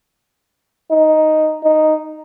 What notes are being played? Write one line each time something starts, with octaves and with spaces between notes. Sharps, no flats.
D#4
D#4